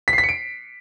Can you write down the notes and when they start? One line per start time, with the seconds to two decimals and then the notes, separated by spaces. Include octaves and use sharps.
0.08 B6
0.13 C7
0.18 B6
0.23 C#7
0.29 D7